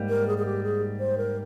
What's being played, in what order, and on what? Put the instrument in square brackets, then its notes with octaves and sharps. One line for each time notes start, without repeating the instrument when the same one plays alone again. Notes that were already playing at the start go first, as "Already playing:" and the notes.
Already playing: [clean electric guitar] G#2 G3 A#3
[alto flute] A#4
G#4
G#4
G4
G#4
C5
A#4